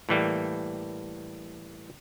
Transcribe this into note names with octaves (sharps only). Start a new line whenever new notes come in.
A2 E3 G3 A#3